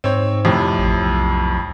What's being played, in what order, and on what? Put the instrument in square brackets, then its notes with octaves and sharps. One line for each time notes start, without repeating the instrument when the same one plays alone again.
[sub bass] G#2 [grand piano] C4 C#5
[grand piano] F2 A2 C3
[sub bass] A1
B1